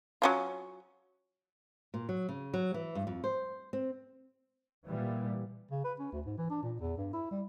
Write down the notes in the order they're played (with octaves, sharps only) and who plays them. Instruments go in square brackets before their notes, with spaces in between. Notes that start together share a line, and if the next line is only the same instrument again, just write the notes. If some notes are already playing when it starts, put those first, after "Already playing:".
[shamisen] F#3 C#4 F4
[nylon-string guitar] A#2
F#3
C#3
F#3
E3
G2
F2
C5
C4
[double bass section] A#2 E3 G3
[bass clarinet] C#3
B4
C#4
D2
G#2
E3
D4
A#2
E2
G2
E4
G3